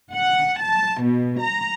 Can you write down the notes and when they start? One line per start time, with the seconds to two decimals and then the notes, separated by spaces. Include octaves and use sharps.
0.13 F#5
0.61 A5
1.04 B2
1.40 A#5